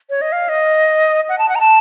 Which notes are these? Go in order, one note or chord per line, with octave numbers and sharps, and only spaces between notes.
C#5
D#5
F5
D#5
F#5
A5
F#5
A#5
A5